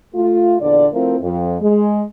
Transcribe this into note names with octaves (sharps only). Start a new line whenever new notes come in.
A3 F4
E2 A#2 D3 D5
F3 A3 C4 E4 F4 A#4
F2
G#3